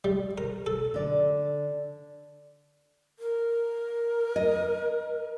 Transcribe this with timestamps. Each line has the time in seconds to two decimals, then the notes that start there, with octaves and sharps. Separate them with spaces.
0.04 G3
0.38 A#4
0.66 A4
0.94 D3 D5
3.19 A#4
4.36 D#5